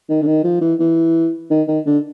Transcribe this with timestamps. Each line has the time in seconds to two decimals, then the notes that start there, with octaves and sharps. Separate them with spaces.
0.09 D#3
0.22 D3
0.26 D#3
0.44 F3
0.61 E3
0.79 E3
1.50 D#3
1.68 D#3
1.86 D3